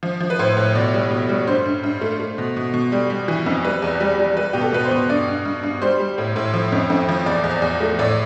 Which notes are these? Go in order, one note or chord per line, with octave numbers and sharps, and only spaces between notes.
F3
F3
B4
A2 C5
A2
B2 D5
G3
B2
G3
G2 C5
G2
G2
A3
A3
B2
B2
B2
G3
G3
E3
F2
G3 B4
E2
G3
G3
G3 B4
B2 G4
A4
B2 B4
C5
B2
G2 D5
G2
G2
G2
G3 C5
G3
A2
A2
F3
F2
F2
F3
E2 D5
E2
D5
E2
A3
A2 D5